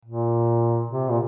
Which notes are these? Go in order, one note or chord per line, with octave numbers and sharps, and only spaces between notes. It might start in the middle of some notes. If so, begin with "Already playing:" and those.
A#2
C3
A#2